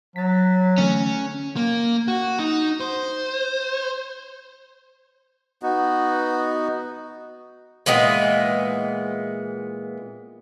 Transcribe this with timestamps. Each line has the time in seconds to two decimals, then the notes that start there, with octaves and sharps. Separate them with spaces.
0.16 F#3 A6 B6
0.78 D3 E3 A3 C#4
1.56 A#3
2.08 F#4
2.39 D#4
2.80 C5
5.62 B3 D#4 F#4
7.86 A#2 E3 G#3 B3